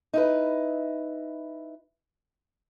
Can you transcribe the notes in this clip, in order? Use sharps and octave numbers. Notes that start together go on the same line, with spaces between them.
D#4 E4 B4